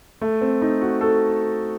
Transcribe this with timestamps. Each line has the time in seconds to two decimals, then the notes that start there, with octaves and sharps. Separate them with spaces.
0.21 A3
0.41 C4
0.62 D#4
0.81 F#4
1.01 A4